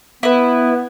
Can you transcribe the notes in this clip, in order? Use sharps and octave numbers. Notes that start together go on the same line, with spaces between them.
B3 E4 B4